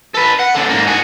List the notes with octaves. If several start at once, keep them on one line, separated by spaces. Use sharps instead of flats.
A4 B4
F#5
F#2 D3
G#2 A#3
F#4 G#4